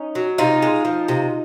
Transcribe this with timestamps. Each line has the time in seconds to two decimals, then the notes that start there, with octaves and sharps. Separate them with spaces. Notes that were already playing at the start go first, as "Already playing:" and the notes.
Already playing: C#4 D#4
0.15 F#3
0.38 C3 D#4 F4
0.62 G#3
0.85 F3
1.08 C3